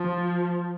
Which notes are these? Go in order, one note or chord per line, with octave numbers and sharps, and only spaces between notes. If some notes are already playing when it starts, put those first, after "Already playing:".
Already playing: F3